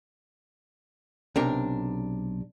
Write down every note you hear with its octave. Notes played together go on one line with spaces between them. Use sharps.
B1 C3 D4 A#4